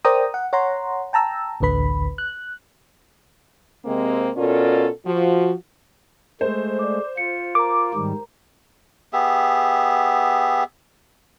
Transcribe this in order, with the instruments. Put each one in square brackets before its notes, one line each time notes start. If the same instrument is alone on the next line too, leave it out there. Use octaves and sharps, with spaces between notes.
[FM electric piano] A#4 C5 D5 G5 A#5 D#6
F#5
C#5 F#5 A#5 C6
G5 A5 A#5 E6
A1 D2 D3 B4 B5
F#6
[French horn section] C3 G#3 A#3 C4
B2 C#4 F4 A4 A#4 D5
F3 F#4
[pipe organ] G#3 A3 [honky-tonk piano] C5
[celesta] D5 D6
[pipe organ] F4 [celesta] C#7
[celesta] A#4 A#5 [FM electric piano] D6
[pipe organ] G#2 D#3 G3
[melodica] B3 G4 G#4 E5